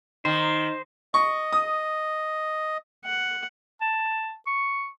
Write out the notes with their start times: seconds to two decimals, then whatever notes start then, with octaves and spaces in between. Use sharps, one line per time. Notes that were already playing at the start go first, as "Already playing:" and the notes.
0.25 D#3 D#4 C5
1.14 D#5 C#6
1.53 D#6
3.05 F#5
3.81 A5
4.47 C#6